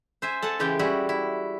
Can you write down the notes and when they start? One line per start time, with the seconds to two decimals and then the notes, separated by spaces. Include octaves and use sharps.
0.22 C5 E5 G#5
0.42 A4 F#5 G#5 A5
0.59 C#3 E3 G#3 G4 G5
0.79 G3 E4 F#4
1.09 E4